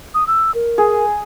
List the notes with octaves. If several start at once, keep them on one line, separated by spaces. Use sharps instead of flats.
D#6
E6
A#4
G#4